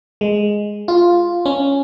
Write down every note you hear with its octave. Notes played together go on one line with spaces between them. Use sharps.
G#3
F4
C#4